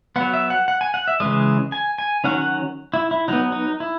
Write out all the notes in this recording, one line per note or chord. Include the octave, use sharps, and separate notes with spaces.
F#3 B3 F#5
E5
F#5
F#5
G#5
F#5
E5
C#3 E3 G#3 D#5
G#5
G#5
D#3 F#3 C#4 F#5
F#5
E4
E4
F#3 B3 D#4
D#4
E4